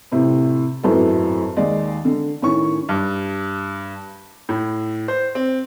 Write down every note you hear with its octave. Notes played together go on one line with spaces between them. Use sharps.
A2 C3 C4
G#1 F#2 A2 B3 A4
D#2 G#3 D5
D3
A2 D#3 C#4 C#6
G2
A2
C5
C4